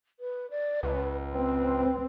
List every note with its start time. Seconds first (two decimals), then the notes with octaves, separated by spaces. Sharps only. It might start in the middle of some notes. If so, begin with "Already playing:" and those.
0.20 B4
0.50 D5
0.83 C#2 B4
1.34 C4 B4